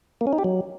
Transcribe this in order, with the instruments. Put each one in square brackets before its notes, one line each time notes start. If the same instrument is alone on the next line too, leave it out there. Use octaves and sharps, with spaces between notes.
[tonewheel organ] A#3
C#4
D#4
G4
F#3